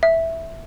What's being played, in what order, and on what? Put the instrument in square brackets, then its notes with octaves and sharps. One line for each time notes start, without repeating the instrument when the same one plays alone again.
[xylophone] E5